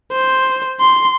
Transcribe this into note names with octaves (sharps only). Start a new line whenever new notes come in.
C5
C6